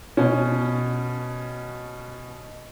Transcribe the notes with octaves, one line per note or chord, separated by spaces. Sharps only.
B2 C#4